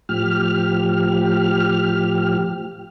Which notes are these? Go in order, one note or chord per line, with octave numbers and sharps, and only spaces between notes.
A2 F3 G4 F6